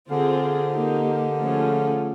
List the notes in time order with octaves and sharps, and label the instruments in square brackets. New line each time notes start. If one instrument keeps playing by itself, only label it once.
[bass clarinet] D3 [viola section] C4 F4 G#4
[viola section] A#3 D#4 G4
F3 A3 C#4 F4 G#4